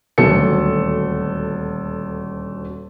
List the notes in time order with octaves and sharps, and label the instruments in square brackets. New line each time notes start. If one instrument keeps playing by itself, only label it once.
[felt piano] D#1 D2 F#3 A4 C#7